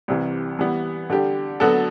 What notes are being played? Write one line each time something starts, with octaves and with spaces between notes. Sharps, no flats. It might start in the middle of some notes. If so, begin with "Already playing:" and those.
C2 C3 E3
E3 G3 B3
D3 G3 D4 G4
D3 F#3 B3 F#4 A4